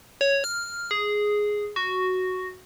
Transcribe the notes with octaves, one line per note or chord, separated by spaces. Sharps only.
C#5
F6
G#4
F#4